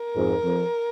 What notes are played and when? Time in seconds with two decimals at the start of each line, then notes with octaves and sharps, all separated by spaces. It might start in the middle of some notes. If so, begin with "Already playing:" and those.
Already playing: A#4
0.16 F2 G#2
0.44 F2